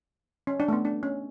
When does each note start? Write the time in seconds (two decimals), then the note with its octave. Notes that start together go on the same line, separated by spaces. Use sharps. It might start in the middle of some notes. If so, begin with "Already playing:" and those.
0.47 C#4
0.60 D4
0.68 A3
0.73 B3
0.85 D4
1.03 C#4